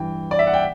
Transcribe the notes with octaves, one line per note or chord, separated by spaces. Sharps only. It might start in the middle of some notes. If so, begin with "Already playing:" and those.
Already playing: G2 E3 G5
D5
E5
F#5
G5